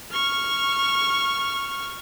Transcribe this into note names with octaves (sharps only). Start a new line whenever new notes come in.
C#6 F6